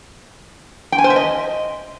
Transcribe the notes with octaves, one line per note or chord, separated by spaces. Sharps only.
G5
G#5
C5
E5
D#5